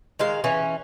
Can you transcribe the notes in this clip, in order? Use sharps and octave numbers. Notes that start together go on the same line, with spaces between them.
D#3 G#3 F5
E3 C#4